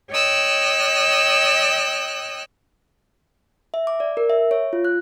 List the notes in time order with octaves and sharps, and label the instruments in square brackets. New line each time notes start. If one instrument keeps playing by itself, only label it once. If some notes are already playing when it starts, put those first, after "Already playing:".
[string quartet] C#5 D#5 G5 E6 F#6
[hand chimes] E5
D6
D5
A#4
E5
C#5
F4
F#6